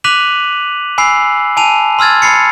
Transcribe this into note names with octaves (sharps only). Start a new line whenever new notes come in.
D6 F#6 B6 D#7 F7 F#7
G#5 B5 E6 C7
G#5 A5 D#7 F7
C6 E6 F6 G#6 A6
B5 A6 C7 C#7